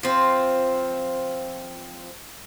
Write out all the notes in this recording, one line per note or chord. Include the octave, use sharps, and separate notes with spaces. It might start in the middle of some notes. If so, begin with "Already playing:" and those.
F3 C4